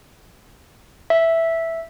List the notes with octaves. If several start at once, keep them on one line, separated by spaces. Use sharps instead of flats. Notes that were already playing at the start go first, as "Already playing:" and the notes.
E5